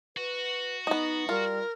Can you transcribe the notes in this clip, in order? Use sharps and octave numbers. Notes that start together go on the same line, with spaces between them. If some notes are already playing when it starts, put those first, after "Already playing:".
F#4 B4
B3 D#4 D#5
G3 F4 A#4